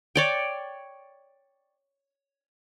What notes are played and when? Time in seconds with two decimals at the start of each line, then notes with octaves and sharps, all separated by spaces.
0.15 C#5 D5 G5